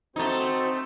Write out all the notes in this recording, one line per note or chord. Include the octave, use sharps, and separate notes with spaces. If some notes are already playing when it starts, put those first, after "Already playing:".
A3 C4 D#4 F#4 C5